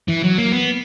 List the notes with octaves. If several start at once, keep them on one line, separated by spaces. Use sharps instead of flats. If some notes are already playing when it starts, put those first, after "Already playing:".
E3
F#3
A#3
B3